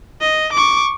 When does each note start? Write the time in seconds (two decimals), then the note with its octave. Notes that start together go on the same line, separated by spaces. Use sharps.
0.21 D#5
0.53 C#6 D6